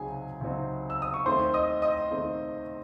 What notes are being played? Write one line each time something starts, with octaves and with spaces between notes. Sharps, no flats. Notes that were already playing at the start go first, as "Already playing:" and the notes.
Already playing: C#2 C3 F#3 C4 D#4 G#4 G#5
C#2 C3 F#3 C4 D#4
E6
D#6
C#6
D#2 D#3 A3 C4 C5 C6
D#5 D#6
D#5 D#6
D#2 D#3 A3 C4